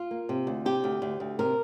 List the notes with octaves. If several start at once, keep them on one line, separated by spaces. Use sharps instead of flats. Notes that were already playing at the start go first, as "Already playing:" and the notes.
Already playing: F4
A#3
C3
D2
C3 G4
D2
D2
D2
C3 A#4